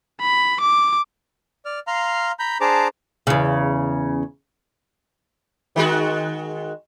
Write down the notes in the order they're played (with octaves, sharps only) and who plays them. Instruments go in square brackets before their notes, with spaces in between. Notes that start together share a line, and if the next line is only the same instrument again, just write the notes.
[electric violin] B5
D6
[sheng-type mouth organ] D5 F6
F5 A#5 C6 F6
A#5 B5 G6
D4 G#4 C5 A5 A#5 D6
[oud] E2 C#3
[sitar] D#3 G#3 F#4